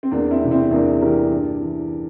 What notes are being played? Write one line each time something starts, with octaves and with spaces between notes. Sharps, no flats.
C4
E2 A#3 D4
C4 E4
C3 E3
C4 E4
E2 A#3 D4
C3 E3 G4 A#4
G2
E3